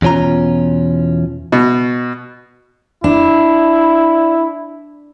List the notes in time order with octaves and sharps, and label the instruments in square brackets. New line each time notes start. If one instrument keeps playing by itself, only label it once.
[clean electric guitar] E2 B2 C#4 F4 A#5
[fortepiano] B2
[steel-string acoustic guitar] D4 [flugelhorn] E4